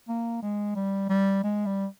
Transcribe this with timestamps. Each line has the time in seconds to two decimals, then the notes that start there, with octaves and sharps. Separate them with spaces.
0.09 A#3
0.42 G#3
0.75 G3
1.09 G3
1.43 G#3
1.66 G3